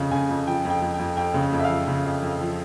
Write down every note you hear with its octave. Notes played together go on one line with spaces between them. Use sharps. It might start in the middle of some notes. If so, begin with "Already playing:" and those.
Already playing: F2 C#3
C#3 G#5
F2
F3 G5
F2
G5
F2
G5
F2
F2 G5
C#3
F2
E5
F3 F5
C#3
F2
F2
F3